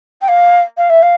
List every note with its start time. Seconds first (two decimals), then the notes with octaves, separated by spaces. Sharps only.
0.21 G5
0.28 F5
0.77 F5
0.89 E5
1.02 F5